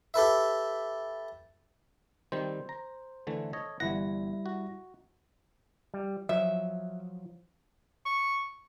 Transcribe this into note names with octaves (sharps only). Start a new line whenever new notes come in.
G4 A4 B4 E5
D#3 G3 C4 C5
A#5
D3 E3 A3
A4 C#5 D#5
G1 E3 G3 E4 F#5 A#6
F#4
G3
F3 F#3 E5
C#6